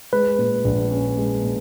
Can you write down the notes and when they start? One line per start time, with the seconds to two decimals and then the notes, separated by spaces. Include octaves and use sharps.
0.13 G#3 B4
0.38 A#2
0.64 A#1
0.91 C#4
1.17 G#3
1.43 A#2